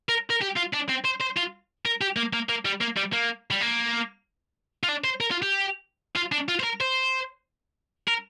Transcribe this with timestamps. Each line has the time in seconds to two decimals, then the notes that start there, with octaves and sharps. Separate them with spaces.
0.09 A#4
0.30 A#4
0.42 G4
0.57 F4
0.74 D4
0.90 C4
1.05 C5
1.21 C5
1.37 F4
1.86 A#4
2.01 G4
2.17 A#3
2.33 A#3
2.49 A#3
2.65 G3
2.81 A#3
2.97 G3
3.13 A#3
3.51 G3
3.61 A#3
4.83 F4
4.89 D4
5.04 C5
5.20 A#4
5.31 F4
5.42 G4
6.16 F4
6.32 D4
6.48 F4
6.60 C5
6.63 A#4
6.81 C5
8.08 A#4